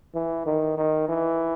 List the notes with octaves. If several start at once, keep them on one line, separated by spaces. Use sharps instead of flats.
E3
D#3
D#3
E3